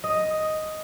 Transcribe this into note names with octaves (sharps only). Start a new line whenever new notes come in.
D#5